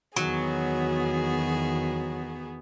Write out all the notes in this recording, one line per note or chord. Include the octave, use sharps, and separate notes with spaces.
E2 D#3 F#3 B3 F#4 G#4